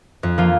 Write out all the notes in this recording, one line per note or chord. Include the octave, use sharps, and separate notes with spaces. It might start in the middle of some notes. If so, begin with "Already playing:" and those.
F2
F3 A#3 F4